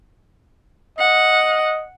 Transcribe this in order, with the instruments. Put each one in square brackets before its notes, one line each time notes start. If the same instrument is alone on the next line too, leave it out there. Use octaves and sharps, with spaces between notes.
[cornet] D#5 [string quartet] F#5